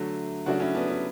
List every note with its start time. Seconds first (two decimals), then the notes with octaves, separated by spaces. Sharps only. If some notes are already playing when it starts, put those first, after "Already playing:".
Already playing: D3 F#3 A3
0.46 C#3 F#3 A3 D4 F#4
0.60 C#4 E4
0.75 B3 D4
0.88 C#4 E4